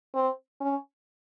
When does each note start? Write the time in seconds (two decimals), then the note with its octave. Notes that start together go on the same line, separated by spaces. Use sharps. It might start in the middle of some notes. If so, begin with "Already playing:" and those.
0.15 C4
0.61 C#4